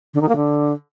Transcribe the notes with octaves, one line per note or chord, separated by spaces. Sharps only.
D3
D#3
A#3
D3